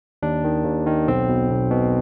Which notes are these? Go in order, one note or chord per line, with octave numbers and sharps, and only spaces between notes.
D#2 D4
D#3
D#2
D#3
B1 C4
B2
B1
B2